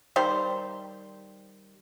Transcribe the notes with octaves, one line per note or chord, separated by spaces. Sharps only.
D#3 G3 C5